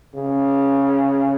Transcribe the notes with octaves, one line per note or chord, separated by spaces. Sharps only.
C#3